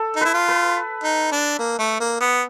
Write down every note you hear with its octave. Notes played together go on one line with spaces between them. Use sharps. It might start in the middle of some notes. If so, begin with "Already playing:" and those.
Already playing: A4
D#4
E4 B4
F4
B4
D#4
D4
A#3
A3
A#3
B3